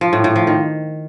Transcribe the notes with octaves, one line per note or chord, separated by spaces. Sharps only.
F3
A2
A2
F3
D#3